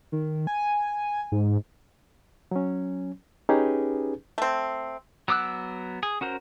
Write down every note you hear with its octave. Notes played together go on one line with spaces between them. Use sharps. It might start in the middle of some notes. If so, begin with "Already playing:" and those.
D#3
G#5
G#2
F#3 C#4
C#4 D#4 G4 G#4 B4
A3 C4
F#3 B3 D6 E6 F#6
G#4
C#4 F#4 A#4 C5